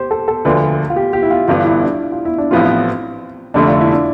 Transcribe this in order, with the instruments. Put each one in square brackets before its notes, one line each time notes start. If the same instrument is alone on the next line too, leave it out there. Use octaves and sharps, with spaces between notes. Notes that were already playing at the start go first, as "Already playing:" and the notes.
Already playing: [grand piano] G4 C5
A4
A4
[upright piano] E1 D2 D3 F3 [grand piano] B4
[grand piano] F4
G4
G4
E4
F4
[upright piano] G1 G2 E3 B3 [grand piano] F4
[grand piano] E4
D4
F4
E4
D4
[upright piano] A1 A2 F3 B3 F4 [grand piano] C4
[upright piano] F1 F2 D3 A3 [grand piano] D4
[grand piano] F4
E4
D4